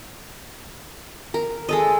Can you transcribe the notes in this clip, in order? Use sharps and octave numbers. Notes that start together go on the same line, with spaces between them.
A#4
G#3 A4 D#5